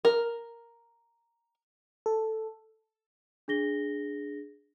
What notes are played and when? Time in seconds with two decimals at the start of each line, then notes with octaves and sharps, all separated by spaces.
0.05 A#4
2.06 A4
3.48 D4 G#4 A#6 G7